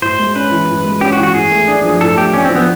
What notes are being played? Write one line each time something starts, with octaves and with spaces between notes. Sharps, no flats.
A2 C5
G#3
C#4 B4
E3
A2
G#3
C#4 G4
F#4
E3
F#4
A2 G#4
A3
D4
F3
A2 A4
A3 G4
C#4 D4
F3 C4
B3